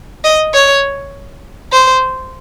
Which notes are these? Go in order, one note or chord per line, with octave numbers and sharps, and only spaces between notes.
D#5
C#5
C5